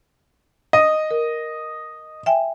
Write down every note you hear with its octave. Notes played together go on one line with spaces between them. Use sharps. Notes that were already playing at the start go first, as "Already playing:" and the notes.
D#5
A#4
E5 G5 G#5